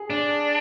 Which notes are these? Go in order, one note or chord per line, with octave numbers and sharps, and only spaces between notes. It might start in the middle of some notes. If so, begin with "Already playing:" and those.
Already playing: G#4
D4